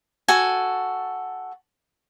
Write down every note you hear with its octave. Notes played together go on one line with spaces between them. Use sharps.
F#4 A4 G#5